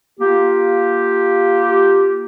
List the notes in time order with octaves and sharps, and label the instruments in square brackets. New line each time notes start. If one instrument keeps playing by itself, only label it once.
[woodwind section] A#3 F4 G4